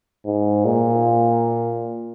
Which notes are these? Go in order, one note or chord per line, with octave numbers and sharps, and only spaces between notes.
G#2
A#2